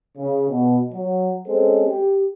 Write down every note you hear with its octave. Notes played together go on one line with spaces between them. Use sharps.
C#3
B2
F#3
G#3 C4 C#4 A4 C5
G4